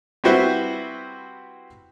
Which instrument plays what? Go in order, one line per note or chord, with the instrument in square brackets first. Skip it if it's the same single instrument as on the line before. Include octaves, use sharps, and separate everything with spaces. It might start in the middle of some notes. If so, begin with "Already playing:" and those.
[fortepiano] G3 C4 E4 F#4 B4 C5